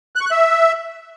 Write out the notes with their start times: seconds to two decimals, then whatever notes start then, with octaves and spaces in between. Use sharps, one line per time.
0.16 F#6
0.21 C#6
0.26 F#6
0.31 E5